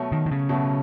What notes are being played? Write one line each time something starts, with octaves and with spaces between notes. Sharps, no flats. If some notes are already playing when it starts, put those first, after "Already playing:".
Already playing: B2 F#3 A3
D#3
D#3
C#3
B2 F#3 A3